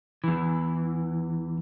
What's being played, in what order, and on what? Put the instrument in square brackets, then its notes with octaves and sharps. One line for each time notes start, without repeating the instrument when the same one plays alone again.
[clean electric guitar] E2 E3